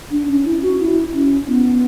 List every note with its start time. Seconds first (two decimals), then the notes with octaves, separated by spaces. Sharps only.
0.11 D4
0.28 C#4
0.45 E4
0.62 F#4
0.79 E4
1.14 C#4
1.48 B3